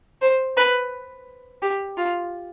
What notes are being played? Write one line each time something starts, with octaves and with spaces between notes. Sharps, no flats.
C5
B4
G4
F4